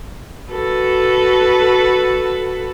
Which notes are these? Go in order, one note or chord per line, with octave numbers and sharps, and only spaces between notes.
F#4 A4 B4